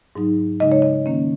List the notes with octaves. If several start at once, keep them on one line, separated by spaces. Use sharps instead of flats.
G#2 F#3 D#4
C#3 G#3 D#4 D#5
C#5
D#5
D#3 A#3 C#4